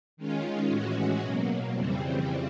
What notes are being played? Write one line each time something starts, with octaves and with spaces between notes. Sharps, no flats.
D#3 G#3 C#4 F4
A2 E3 G#3 C#4 F#4
B2 F#3 A#3
F2 C#3 E3 G3 C4